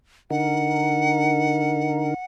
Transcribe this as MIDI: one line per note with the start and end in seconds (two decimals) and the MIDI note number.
0.30 2.14 50
0.30 2.14 63
0.30 2.14 70
0.30 2.25 78